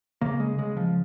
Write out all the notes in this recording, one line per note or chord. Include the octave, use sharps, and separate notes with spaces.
C#3 A#3
G#3
C#3 G#3
F3